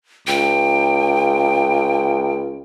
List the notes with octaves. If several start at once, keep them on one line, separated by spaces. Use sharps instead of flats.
C#2 G5